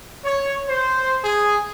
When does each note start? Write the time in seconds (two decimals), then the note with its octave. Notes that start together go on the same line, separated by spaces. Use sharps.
0.25 C#5
0.68 C5
1.24 G#4